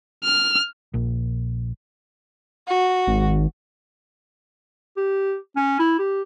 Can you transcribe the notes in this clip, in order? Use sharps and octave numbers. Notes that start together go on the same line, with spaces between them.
F6
A#1
F#4
G#1
G4
C#4
E4
G4